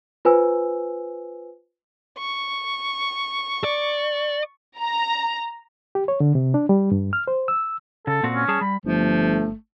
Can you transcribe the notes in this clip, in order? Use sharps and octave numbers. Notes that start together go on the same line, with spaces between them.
F4 B4 C5 G#5 E6
C#6
D5
A#5
G4
C#5
D3
C3
D4
G3
G2
F6
C5
E6
C#3 A4
A#2 C4 F#4
C#4
G3 G#4 A5
G3 B5
G1 F3 A3